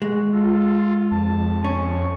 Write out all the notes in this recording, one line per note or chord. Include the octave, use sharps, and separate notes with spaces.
G#3 F#4
F4 A4
F2 A5
C#4 C#6